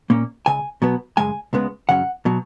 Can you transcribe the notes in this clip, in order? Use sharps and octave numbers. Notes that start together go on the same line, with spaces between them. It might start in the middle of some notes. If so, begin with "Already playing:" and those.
A#2 A#3 C#4
C#2 C#3 G#5
B2 F#3 B3
F#2 C#3 G#3 G#5
C#2 C#3 G#3 B3
F#2 C#3 F#3 C#4 F#5
B2 F#3